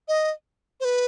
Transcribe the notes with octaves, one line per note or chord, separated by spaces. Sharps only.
D#5
C5
B4